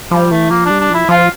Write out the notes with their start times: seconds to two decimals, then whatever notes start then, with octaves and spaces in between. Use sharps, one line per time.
0.11 F3 G3
0.31 E3 A3
0.50 F3 A#3
0.65 G3 D4
0.80 D4
0.90 F3 E4
1.09 F3 F4